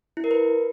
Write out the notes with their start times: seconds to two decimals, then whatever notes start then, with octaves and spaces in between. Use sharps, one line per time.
0.17 E4
0.24 A#4
0.31 B4